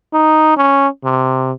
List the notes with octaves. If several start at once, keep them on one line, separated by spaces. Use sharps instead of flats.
D#4
C#4
C3